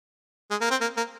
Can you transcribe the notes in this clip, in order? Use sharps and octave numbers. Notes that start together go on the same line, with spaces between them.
G#3
A#3
C4
A#3
A#3